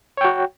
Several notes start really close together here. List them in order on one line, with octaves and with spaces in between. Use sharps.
C#5 G5 F#4